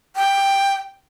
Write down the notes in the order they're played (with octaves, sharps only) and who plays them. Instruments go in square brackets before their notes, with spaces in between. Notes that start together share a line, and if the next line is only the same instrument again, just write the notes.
[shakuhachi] G5